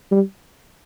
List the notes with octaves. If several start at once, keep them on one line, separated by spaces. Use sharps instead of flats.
G3